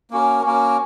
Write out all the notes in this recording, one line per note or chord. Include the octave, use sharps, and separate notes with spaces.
A#3 C#4 F#4 A#4
A#3 C#4 F#4 A#4